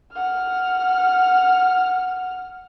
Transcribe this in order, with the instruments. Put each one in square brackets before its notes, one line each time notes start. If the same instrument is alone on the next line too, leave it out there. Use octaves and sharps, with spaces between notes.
[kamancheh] F#5 F6